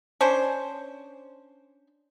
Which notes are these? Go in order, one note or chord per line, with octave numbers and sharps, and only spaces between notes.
C#4 D4 C5